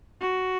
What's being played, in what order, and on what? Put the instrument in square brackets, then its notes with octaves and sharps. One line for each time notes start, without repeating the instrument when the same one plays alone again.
[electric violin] F#4